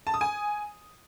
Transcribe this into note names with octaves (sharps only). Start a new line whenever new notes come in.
A5
D#6
G#5